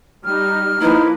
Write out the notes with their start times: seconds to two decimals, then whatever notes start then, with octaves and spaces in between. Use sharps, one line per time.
0.25 G3 D#4 F6
0.82 F3 A#3 D#4 E4 B4